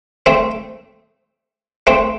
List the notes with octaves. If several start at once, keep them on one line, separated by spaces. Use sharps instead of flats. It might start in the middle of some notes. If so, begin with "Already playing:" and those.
A3 C4
A3 C4